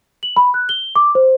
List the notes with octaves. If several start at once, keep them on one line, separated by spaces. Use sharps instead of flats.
F#7
B5
F#6
G7
D6
C5